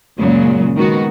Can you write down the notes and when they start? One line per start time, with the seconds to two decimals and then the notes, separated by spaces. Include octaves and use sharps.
0.18 F#2 A#2 C#3 F#3 G#3
0.76 D#3 G#3 B3 F#4